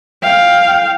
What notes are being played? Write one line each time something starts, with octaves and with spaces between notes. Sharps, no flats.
F5 G5